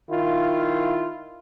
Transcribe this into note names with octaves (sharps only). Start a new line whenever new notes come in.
D#3 E4 F4